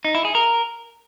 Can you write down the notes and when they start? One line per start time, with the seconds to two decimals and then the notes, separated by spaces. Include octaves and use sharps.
0.05 D#4
0.15 E4
0.25 G#4
0.35 A#4